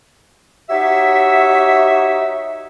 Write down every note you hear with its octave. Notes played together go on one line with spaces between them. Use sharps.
D#4 F#4 G4 C#5 E5